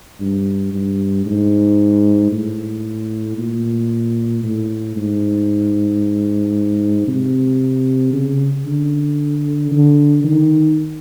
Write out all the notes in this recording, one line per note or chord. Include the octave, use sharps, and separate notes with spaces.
G2
G2
G#2
A2
A#2
A2
G#2
C3
C#3
D3
D3
D#3